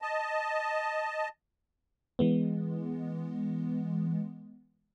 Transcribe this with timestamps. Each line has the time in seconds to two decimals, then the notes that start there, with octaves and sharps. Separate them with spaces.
0.02 D#5 A5
2.19 E3 G#3 B3